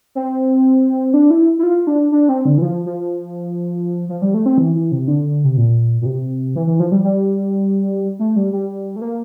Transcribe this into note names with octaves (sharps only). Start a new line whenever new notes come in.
C4
D4
E4
E4
F4
D4
D4
C4
D3
E3
F3
F3
F3
G3
A3
C4
E3
E3
C3
D3
C3
A#2
A#2
C3
E3
E3
F3
G3
G3
A3
G3
G3
A3
A#3